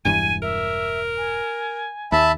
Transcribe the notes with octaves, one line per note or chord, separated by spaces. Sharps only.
E1 G2 E3 G#5 D#7
A#4 E5
G#5
D#2 E5 A5 B5